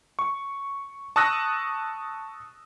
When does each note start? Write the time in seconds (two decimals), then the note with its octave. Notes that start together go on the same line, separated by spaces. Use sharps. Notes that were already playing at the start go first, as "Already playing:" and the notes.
0.19 C#6
1.16 A5 C#6 D#6 E6 F#6 A#6